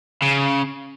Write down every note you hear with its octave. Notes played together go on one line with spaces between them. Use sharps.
C#3